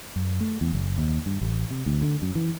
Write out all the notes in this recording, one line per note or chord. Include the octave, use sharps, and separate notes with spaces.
F#2
A3
E2
F#1
D#2
G2
A1
C3
D2
D3
F#2
E3